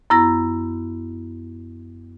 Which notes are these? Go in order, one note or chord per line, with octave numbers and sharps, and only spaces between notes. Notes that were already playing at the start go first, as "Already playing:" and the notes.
F#2 B3 E4 A#5 A#6